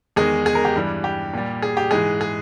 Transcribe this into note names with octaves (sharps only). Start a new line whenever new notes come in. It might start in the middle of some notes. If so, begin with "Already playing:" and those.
E2 D#3 G#3 G#4
G#4
A#4
G4
G2 E3 G3
G4
A#2 G3
G#4
G4
G#2 E3 G#3 G#4
G#4